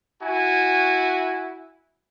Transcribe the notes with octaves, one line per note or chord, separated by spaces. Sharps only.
E4 F#4 G#5